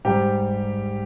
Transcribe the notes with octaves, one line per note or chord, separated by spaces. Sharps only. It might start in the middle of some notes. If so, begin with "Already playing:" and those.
G#2 G3 G4